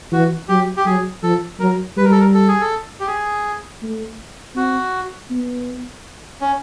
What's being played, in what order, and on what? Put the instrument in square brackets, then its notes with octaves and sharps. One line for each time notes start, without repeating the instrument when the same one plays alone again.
[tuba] E3 [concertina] F#4
[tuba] F#3 [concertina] G4
[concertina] G4
[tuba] F#3 [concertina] G#4
[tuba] F3 [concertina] A4
[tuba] F#3 [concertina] A#4
[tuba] G3 [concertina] B4
[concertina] A#4
A4
A#4
A4
G#4
A4
G4
G#4
[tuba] A3
[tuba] C4 [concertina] F#4
[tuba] B3
[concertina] C#4